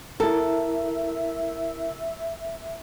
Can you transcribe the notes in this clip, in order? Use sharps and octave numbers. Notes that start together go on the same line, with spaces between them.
E4 A4 A#4 E5